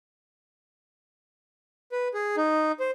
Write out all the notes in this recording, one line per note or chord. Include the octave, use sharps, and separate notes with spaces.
B4
G#4
D#4
C5